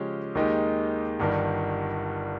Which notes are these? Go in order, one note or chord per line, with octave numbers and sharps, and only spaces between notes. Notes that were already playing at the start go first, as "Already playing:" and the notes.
Already playing: C#3 F3 G#3 C#4 G4
D#2 D#3 G#3 D#4 G4
G1 G2 D#3